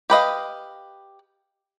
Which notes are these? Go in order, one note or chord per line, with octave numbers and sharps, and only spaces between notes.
G4 B4 D#5 F5